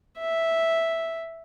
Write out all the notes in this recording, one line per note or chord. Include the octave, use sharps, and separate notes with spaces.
E5